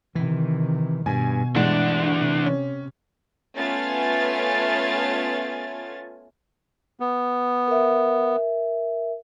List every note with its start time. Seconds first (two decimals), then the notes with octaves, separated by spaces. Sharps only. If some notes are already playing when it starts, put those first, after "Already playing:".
0.15 C3 D#3 E3
1.06 G2 B2 G#5
1.56 D2 G2 E3 G#3 D4 F#5
2.16 C3
2.46 C#4
3.55 A3 B3 C#4 F4 G#5 A6
7.00 B3
7.68 A#4 E5